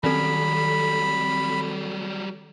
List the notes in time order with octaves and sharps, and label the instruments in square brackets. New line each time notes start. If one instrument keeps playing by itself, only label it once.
[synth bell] D#3 C4 A4 [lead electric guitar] F#3 G3 [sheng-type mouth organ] B5